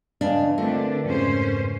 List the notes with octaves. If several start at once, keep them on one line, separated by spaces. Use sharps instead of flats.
E2 C#3 D4 D#5 F5 A5
D3 A3 C4 D4 F4 A#4 B4
F2 G#2 C#3 C#4 C5